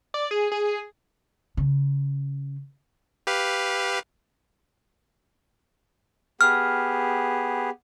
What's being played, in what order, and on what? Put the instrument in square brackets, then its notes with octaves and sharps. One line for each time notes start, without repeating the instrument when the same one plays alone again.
[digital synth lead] D5
G#4
G#4
[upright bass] C#3
[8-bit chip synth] G4 B4 F5
[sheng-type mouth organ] B3 G4 G#4 [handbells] F6